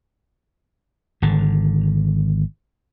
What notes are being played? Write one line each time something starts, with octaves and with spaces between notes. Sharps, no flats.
G#1 D3